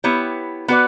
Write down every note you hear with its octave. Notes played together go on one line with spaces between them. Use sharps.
B3 E4 G4 C#5
B3 F#4 B4 D5